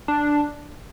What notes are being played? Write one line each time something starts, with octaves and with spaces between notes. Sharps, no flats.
D4